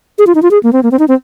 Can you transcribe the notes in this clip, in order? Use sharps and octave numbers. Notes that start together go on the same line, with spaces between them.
G#4
F4
D#4
F4
G#4
A#3
C4
A#3
C4
D#4
C4